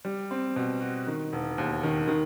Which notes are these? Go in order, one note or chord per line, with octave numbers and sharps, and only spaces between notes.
G3
C4
B2
F#4
D#3
E1
D#2
D#3
D#3